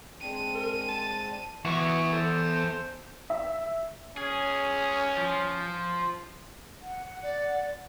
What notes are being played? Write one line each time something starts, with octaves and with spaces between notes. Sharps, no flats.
G#3 C4 D4 D#7
A#4
A5
E2 E4 F#4 B4 C#6
A4 C5
E5
C#4 G#4
F3
F#5
D5